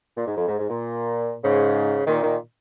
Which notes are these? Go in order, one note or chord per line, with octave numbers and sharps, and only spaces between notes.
A#2
G#2
F2
G#2
G#2
A#2
G#2 C#3
A#2 D#3
A#2 D#3